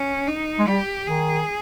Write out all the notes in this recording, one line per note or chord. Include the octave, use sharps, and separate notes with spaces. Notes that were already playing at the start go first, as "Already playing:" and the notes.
Already playing: C#4
D#4
G#3
G3 G4
D#3 G#4